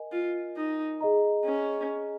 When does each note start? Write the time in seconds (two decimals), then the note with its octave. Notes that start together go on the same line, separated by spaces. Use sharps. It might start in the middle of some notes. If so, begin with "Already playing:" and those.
Already playing: A#4 D#5 G#5
0.12 F4
0.57 D#4
1.01 G#4 D#5 A#5
1.45 C#4